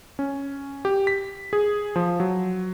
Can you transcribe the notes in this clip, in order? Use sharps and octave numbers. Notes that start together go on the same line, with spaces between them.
C#4
G4
B6
G#4
F3
F#3